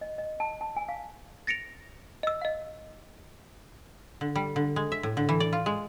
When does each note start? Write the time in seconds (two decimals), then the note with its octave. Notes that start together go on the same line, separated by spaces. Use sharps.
0.01 D#5
0.18 D#5
0.40 A5
0.61 A5
0.76 G#5
0.89 F5
1.47 A6 A#6 C#7 D7 F7
2.23 D#5 E6
2.41 D#5 F5
4.21 D3
4.35 G3
4.56 D3
4.76 G#3
4.92 E5
5.03 A2
5.17 D3
5.29 E3
5.40 D5
5.53 F4
5.66 G#3